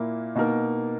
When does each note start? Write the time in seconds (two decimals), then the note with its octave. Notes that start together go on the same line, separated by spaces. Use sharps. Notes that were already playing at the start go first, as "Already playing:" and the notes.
Already playing: A#2 A#3 E4 A#4
0.35 B2 A#3 D#4 A#4